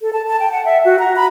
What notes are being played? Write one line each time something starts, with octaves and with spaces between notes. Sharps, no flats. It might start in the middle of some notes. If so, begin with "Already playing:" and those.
A4
A5
A5
G5
F#5
E5
F#4
A#5
B5